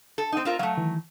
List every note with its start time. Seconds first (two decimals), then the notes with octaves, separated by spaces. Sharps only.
0.18 A4
0.32 C4 D#4
0.45 C4 F4 A#4
0.59 F#3 A3 F5
0.78 D#3 E3